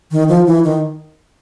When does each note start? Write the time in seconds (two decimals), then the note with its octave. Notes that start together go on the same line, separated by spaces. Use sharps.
0.11 D#3
0.29 F3
0.46 E3
0.64 D#3